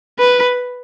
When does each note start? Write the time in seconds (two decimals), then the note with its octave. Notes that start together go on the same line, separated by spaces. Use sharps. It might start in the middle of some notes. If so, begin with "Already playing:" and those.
0.19 B4